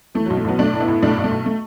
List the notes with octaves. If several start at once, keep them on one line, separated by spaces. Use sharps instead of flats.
E3 A3
B1 F#3
A3
B1 F#3 B3
B1 A3 D4
A2
B3 E4
A2
B1 A3 D4
B1
A3
B1
A3